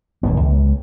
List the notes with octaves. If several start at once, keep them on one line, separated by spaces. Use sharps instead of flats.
D#1 D2 B3
C#2